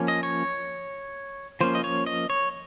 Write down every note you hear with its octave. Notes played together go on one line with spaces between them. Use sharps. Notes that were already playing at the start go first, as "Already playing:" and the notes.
Already playing: F3 A#3 C#4
D#5
C#5
F3 A#3 C#4 C5
D#5
C#5
D#5
C#5